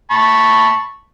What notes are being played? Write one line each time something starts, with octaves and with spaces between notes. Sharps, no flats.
A5 B5 C#6